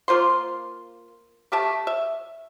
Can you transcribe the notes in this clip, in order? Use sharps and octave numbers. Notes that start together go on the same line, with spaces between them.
A#3 F4 C5 C6
A3 G4 E5 A5
E5